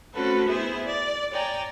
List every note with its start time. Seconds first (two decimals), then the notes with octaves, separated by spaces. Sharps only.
0.13 A3 C4 C#4 F#4 A4 B4
0.47 B3 E4 G#4 C5 E5
0.84 D5
1.31 C#5 D5 G5 G#5 A#5